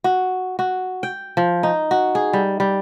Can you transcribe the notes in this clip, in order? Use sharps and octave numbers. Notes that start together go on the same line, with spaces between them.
F#4
F#4
G5
F3
D#4
F#4
G#4
G3
G3